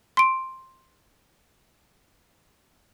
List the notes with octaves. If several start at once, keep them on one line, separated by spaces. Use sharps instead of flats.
C6 D7